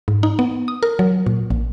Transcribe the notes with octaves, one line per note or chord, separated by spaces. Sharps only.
G#2
D#4
B3
D#6
A#4
F#3
A#2
A#1